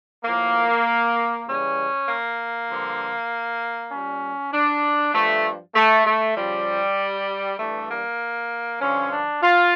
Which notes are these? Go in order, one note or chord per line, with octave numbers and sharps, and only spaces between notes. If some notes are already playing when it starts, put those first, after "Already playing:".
A2 F3 A#3
C#3 E3 G3 C#4
A#3
G2 D3 F3
A#2 G3 C#4
D4
G2 F3 A3
A3
A3
C#3 F3 G3
G2 E3 G3 A3
A#3
G2 D3 F3 C#4
D4
F4